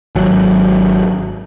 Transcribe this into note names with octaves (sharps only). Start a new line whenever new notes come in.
G#1 F#3